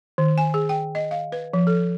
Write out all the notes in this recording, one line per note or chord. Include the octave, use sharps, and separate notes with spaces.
D#3
G#5
G#4
G5
D#5
F5
B4
F3
A4